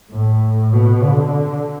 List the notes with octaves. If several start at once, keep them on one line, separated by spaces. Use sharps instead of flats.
A2
B2
D3